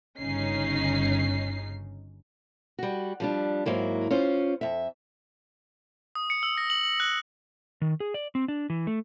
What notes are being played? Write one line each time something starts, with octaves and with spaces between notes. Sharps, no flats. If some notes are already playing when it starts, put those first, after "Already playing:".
G1 C#3 C#4 D#4 C7
G3 F#4
F3 G3 D4
G#2 F#3 A#3 E4
C#4 F4 C5
F2 E5
D#6
C#7
E6
A#6
F#7
F#7
F#6
D#3
G#4
D5
C4
D4
E3
A3